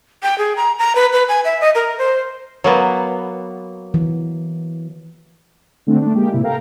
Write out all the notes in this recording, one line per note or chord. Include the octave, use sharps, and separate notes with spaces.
G5
G#4
A#5
A#5
B4
B4
G#5
E5
D#5
A#4
C5
F#3 A#3 B3
E3
D3 A3 C4 D4
A3 D4
G#3 A#3 G4
A2 C3 E4
A4 A#4 F5 G5 A#5